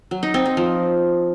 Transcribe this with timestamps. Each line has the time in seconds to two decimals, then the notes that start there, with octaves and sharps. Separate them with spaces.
0.11 F#3
0.23 D#4
0.34 C4
0.46 D#4
0.57 F3